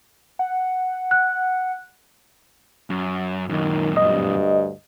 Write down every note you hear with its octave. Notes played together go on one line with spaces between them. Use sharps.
F#5
F#6
F#2
F#2 A#2 D#3
D2 G2 D#5